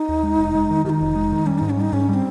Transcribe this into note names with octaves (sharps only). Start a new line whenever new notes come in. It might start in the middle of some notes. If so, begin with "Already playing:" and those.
Already playing: D#4
D#2
G#3
F1
G#3
D#3
D#3 D#4 G4
F1
G#3
D#3
G3 C#4
G#2 D#4
C#4
G3 D#4
G#2 C#4
G3 C4 C#4